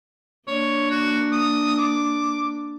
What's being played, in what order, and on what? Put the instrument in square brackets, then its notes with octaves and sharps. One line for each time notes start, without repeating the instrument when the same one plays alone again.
[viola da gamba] A#3 D4 [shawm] C#5
[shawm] F#4
D#6
D6